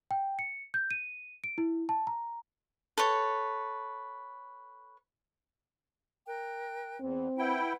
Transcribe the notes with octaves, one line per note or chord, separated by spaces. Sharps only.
G5
C#7
G6
D#7
D7
E4
A5
A#5
A4 B4 C#5
A#4 G5 F#6
E2 C4
E4 B4 F#5 G5